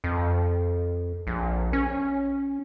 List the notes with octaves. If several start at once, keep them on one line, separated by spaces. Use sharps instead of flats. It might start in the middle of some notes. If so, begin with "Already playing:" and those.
F2
A#1
C#4